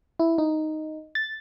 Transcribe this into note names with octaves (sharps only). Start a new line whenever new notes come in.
E4
D#4
A6